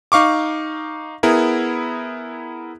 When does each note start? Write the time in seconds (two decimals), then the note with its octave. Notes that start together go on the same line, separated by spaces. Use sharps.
0.12 D#4 F5 C#6 D6
1.23 B3 E4 G#4 A#4